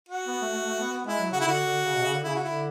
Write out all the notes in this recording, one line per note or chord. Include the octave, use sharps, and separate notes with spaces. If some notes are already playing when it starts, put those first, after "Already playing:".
F#4
B3
A3
A3
A3
B3
B3
G#3 E4
F#3
C#3 F#4
E4
D3 F#4
D3
C#3
B2
C#3
D3
C#3 E4
F#4
D3 E4